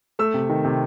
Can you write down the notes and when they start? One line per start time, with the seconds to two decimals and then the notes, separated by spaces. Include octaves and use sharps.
0.19 A3 E6
0.34 C3
0.49 D#3
0.65 C3